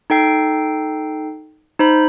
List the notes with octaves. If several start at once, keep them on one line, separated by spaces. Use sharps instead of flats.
D#4 A4 G5 C7
D#4 C5 B5